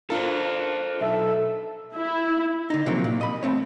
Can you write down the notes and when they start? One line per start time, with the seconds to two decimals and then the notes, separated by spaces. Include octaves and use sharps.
0.10 D4 F4 A4 A#4 C5
1.01 B1 A4 E5
1.95 E4
2.70 D3 D#4
2.86 C3 F3 F#3 A#3 C4
3.04 A#2
3.21 D#5 B5
3.43 A3 C4 C#5